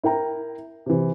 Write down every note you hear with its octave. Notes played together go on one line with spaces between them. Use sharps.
E4 A#4 G5 A#5
C3 E3